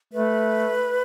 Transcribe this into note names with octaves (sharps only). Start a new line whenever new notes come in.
A3 B4